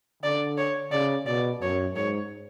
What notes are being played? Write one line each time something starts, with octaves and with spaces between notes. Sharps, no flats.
D3 D5
C#5
C#3 D5
B2 D5
F#2 C#5
G#2 C#5